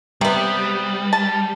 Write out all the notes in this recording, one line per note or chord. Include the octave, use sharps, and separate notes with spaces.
C3 G3 B3
A5